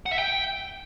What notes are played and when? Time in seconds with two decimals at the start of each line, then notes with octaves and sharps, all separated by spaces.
0.06 F#5
0.12 E5
0.19 G5